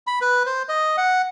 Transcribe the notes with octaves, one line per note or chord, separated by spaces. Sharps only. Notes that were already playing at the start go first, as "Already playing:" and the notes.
B5
B4
C5
D#5
F#5